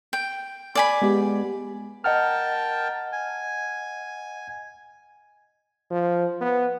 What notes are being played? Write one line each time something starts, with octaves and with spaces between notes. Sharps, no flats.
G5
D5 G#5 B5
G#3 B3 G4
A#4 D#5 F#5 G5 A5 F6
G#5
F3
B3